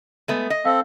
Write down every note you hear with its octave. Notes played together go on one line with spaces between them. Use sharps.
G#3 A3 B3
D#5
C4 A4 F5